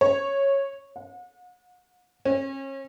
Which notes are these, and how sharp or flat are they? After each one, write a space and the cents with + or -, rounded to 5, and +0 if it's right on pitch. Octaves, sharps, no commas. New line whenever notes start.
C#5 -10
F#5 -40
C#4 -40